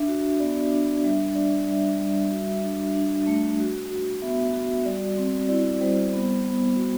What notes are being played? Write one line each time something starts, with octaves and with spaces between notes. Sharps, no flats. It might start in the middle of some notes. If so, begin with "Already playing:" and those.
Already playing: D4 E5
F#4
B3 D5
D4
G3 E5
D4 D5
G3 E5
G3
F#4 E5
D4
D4
A3
F#4
F#4
B3 E5
F#4
G3 D5
C4
E4 D5
G3 C5
B3
B3
F#4